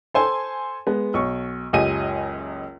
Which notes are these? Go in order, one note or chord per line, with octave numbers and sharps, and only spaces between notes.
A4 C5 G#5 C6
G#3 B3
B1 C#6
F#1 C#2 G4 D#5 G#5 D#7